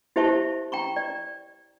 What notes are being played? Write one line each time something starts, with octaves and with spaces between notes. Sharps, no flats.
E4 G4 C5 E5 A5 C#6
G5 A#5 C#6
D5